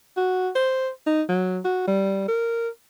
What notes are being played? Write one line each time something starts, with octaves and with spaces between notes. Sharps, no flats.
F#4
C5
D#4
F#3
F#4
G3
A#4